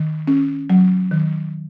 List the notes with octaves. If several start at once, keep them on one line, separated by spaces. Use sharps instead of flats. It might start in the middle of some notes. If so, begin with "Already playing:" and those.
Already playing: D#3
C#4
F#3
D#3